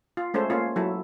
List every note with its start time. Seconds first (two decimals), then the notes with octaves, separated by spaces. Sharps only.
0.17 F4
0.34 G#3 A3 C#4 A4 C5
0.50 A#3 C#4 F4
0.76 F#3 E4 A4